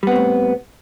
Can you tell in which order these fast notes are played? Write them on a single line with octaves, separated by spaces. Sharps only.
G3 B3 C4 A2